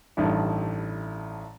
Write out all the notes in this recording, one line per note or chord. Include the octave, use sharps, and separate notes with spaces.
A1 G2 D#3 D4 E4